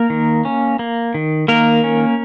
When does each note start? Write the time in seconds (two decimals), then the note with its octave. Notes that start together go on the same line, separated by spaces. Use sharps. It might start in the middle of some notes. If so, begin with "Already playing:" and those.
Already playing: A#3 A#4
0.10 D#3
0.45 C#4
0.79 A#3
1.14 D#3
1.48 D#3 A#3 A#4
1.84 C#4